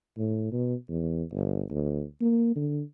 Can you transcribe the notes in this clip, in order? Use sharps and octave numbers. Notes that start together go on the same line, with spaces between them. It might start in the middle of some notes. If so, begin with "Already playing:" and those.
A2
B2
E2
G1
D2
A#3
D3